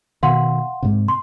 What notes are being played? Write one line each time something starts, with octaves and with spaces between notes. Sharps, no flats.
B2 D#3 F5 F#5 C6
G#2 C3
C6